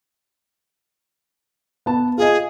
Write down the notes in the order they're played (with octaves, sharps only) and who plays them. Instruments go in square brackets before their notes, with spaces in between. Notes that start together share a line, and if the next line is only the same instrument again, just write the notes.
[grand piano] B3 A5
[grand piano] F4 D#5 [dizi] G#4